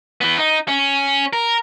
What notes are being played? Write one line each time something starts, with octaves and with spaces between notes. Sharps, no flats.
E3 B3
D#4
C#4
A#4